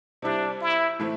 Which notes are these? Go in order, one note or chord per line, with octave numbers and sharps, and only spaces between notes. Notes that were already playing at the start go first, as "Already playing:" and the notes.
C3 G3 D4 E4
E4
A2 E3 A3 C4 E4